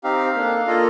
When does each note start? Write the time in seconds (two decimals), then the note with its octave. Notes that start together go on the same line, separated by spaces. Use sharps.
0.04 C4 D#4 G4 F5
0.35 A#3 D4 A4
0.67 A#3 F4 A4 D#5